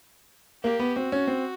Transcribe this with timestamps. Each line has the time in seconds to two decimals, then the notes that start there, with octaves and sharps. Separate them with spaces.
0.63 A#3 G4
0.80 B3
0.96 C4 F#4
1.12 C#4
1.27 C4